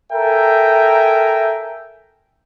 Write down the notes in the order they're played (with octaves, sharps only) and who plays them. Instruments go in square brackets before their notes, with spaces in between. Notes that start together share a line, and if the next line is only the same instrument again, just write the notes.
[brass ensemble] A4 A#4 E5 G5 G#5 A#5